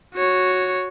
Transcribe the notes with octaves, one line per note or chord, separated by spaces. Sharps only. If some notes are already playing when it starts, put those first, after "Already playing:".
F#4 C#5